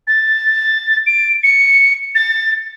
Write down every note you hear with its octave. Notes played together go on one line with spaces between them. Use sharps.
A6
D7
C#7
A6